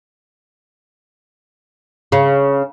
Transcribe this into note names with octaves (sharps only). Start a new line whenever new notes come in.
C#3